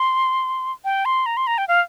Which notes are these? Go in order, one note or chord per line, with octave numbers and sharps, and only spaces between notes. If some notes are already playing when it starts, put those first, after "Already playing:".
Already playing: C6
G5
C6
A#5
C6
A#5
G5
F5